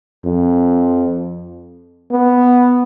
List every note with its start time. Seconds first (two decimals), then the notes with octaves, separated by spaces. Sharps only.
0.25 F2
2.11 B3